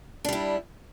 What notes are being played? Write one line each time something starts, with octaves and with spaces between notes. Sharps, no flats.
G3 D4 E4